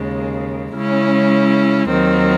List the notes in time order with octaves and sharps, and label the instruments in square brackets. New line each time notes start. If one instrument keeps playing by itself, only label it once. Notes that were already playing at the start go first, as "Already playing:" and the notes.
Already playing: [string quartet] D#2 C#3 G#3
C#3 G#3 C#4 E4
D#2 D#3 F#3 C4